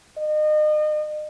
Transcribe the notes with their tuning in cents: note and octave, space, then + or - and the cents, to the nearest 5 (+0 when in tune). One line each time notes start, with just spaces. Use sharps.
D#5 -35